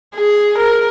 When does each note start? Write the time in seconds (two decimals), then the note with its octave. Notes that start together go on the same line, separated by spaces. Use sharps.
0.15 G#4
0.58 A#4